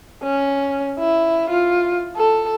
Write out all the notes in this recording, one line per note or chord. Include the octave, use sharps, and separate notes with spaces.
C#4
E4
F4
A4